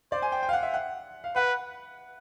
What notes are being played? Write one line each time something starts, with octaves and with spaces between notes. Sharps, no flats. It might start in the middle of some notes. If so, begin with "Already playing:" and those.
C5 D5
G#5
G5
G5
F5
F#5
E5
F#5
F5
B4 F#5